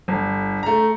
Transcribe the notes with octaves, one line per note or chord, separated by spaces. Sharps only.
G1
A3 A#5